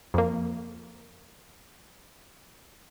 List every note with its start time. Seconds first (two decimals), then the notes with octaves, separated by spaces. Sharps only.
0.14 F2 A#3